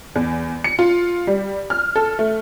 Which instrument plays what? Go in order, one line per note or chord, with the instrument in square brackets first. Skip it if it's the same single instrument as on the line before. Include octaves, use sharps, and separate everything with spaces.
[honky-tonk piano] E2
C#7
F4
G3
F6
A4
A3